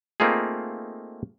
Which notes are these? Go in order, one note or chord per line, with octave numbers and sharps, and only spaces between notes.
A3 A#3 C4 D#4 F4 G#4